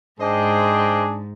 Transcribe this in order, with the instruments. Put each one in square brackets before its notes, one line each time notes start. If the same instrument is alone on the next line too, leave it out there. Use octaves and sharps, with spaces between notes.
[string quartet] G#2 [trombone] D4 [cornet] G#4 [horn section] C5 D#5 G5